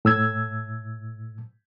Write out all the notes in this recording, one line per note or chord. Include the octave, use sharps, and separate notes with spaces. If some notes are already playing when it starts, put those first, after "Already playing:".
A2 E6 G#6